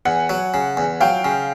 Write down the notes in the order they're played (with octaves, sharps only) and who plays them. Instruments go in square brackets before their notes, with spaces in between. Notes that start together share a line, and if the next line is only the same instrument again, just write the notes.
[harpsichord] E2 [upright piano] F#5 G#5
[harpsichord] F#3
C#3
E2
[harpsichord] F#3 [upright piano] F5 G5
[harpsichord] C#3